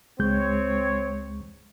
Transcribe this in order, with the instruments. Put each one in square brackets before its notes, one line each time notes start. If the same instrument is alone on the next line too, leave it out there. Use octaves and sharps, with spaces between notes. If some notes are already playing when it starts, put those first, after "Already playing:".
[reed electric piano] C#2 G#3 G6 [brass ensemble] C4 C#5